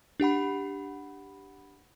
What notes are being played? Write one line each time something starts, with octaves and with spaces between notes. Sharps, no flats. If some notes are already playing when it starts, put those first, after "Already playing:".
D4 G4 F#5 B5